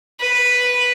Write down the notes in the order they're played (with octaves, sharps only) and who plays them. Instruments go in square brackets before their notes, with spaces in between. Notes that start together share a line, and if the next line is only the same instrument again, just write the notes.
[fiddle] B4